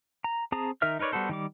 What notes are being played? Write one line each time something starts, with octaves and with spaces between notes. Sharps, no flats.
A#5
C4 G#4 A5 A#5 D#6
D#3 D#4 A#4 E5 F6
D#4 A#4 B4 C#5 D5
G3 B3 F#4 A4 C5
D#3 G3 D6